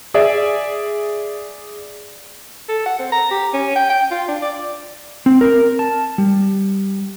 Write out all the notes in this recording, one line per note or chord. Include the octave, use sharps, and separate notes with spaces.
G#4 D5 E5
A4
F#5
C4
A#5
G4
C#4
G5
G5
F4
D4
D5
C4
A#4
A5
G3